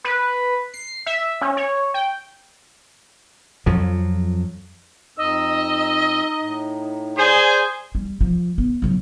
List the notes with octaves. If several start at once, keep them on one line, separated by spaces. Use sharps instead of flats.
B4
C7
E5
C#4
C#5
G5
F2 F3 F#3
F2 D#4 D#5 E6
A2
G#4 C5 D5 G#5
G3
F3
B3
C#3 F#3